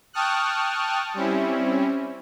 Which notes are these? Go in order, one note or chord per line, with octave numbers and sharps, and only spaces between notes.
G5 A5 C#6 D#6 F6 F#6
G3 C4 C#4 E4